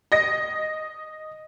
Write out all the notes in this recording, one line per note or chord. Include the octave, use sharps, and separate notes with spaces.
D#5 A#6